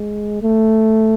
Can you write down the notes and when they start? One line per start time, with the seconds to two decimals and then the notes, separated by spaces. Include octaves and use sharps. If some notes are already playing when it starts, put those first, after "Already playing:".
Already playing: G#3
0.43 A3